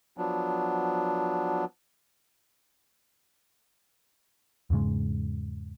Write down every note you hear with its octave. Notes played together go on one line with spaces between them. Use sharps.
F3 F#3 B3 D4
E2 G#2 C#3 G#3